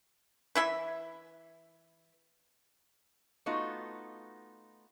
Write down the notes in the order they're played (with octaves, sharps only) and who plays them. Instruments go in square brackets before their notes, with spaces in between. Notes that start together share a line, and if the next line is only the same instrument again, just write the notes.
[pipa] E3 E4 E5
[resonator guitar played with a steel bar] A3 B3 D#4 F4 F#4